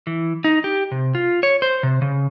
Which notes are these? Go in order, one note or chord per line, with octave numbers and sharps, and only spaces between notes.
E3
D#4
G4
C3
F4
C#5
C5
C3
C#3